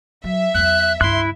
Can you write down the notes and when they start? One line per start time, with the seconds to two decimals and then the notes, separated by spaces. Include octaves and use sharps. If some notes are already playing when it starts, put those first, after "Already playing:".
0.24 F#3 E5
0.54 E2 F#3 F#6
1.01 C#2 G2 E4 C6 F#6